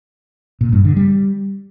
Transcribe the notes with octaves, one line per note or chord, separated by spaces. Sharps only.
A#2
G2
D3
G3